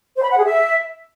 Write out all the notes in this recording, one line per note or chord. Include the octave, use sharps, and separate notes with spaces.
C5
B5
F#5
G#4
E5